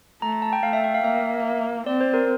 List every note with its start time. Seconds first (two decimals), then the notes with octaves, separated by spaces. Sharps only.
0.22 A3 A#5
0.32 A#5
0.42 A5
0.53 G5
0.63 A3 F5
0.73 E5
0.84 G5
0.94 F5
1.04 A#3 E5
1.86 C4 D5
2.01 C5
2.14 A#4